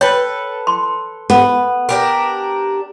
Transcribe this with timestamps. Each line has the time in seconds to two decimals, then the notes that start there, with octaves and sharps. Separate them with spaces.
0.01 A4 B4 C#5 G5
0.67 C6
1.30 B3
1.89 D4 G4 A#4